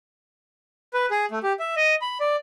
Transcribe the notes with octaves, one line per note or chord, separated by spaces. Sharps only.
B4
G#4
A3
G4
E5
D#5
B5
D5